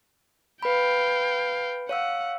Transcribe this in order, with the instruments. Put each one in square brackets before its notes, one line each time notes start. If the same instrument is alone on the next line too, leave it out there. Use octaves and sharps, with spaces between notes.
[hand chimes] B4 B5 [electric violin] F5 G5
[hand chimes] C#5 F5 E6 [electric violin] F#5